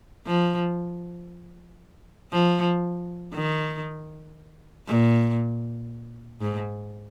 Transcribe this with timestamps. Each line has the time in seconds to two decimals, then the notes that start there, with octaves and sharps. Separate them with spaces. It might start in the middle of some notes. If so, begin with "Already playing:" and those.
0.26 F3
2.32 F3
3.34 D#3
4.87 A#2
6.41 G#2